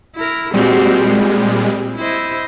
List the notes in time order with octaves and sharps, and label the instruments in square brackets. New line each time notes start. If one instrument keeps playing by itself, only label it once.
[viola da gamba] E4 A#4
[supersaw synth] A#2 G3 G#3 [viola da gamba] C4 F#4 G4
[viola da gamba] C4
E4 C5 D#5